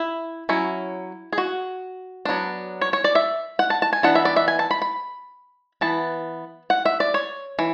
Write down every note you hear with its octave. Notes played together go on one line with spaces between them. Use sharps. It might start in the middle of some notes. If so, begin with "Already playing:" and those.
Already playing: E4
F#3 C#4 E4
G#4
F#4
F#3 B3 D4
C#5
C#5
D5
E5
F#5
A5
A5
G#5
E3 B3 D4 F#5
E5
D5
E5
G#5
A5
B5
B5
E3 B3 A5
F#5
E5
D5
C#5
E3